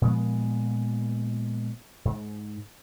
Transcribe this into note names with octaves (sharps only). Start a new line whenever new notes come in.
A#2 F3 G#3 B3
G#2